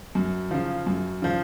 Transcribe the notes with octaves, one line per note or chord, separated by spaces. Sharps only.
F#2
C#3 F3
F#2
C#3 F3